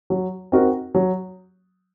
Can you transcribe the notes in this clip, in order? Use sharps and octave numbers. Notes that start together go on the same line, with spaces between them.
F#3
C4 D#4 F#4 A#4
F#3